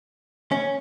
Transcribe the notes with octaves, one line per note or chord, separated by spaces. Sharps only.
C#4